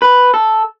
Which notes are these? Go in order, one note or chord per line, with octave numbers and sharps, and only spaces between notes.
B4
A4